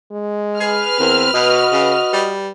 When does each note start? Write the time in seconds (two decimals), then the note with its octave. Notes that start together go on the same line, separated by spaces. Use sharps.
0.11 G#3
0.60 G#4 B4 F6
0.99 E2 C4 A#4
1.34 B2 F#4 D#5
1.72 C#3
2.13 G3